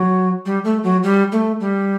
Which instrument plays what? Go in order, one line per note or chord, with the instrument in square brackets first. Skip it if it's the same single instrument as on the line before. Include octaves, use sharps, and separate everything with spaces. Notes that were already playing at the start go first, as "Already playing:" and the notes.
Already playing: [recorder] F#3
G3
A3
F#3
G3
A3
G3